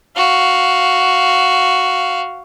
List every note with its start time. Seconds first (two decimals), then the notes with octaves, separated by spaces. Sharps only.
0.16 F#4 F5